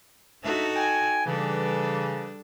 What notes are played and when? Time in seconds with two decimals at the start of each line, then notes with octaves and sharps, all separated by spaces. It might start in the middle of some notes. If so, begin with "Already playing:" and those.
0.44 D4 D#4 F#4 A4 E5
0.75 G5 G#5
1.26 C#3 E3 G3 D4 A4